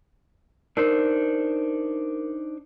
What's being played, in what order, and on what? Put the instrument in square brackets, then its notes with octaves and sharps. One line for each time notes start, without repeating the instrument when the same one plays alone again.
[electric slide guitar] D4 D#4 C5 [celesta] A#4